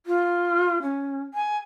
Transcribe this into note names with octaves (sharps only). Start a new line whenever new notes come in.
F4
C#4
G#5